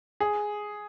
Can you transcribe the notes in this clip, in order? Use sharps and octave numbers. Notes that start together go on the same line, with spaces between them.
G#4